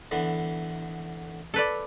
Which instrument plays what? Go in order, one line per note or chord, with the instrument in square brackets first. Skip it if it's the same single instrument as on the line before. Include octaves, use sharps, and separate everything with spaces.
[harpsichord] D3 E3 B3
[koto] A4 B4 D5